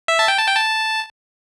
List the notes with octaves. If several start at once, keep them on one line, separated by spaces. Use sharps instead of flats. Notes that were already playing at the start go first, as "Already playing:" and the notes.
E5
A5
G5
A5
G5
A5